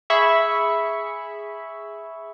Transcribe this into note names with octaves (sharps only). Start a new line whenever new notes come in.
G#4 E5 B5 C#6